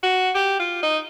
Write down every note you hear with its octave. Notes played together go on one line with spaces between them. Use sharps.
F#4
G4
F4
D#4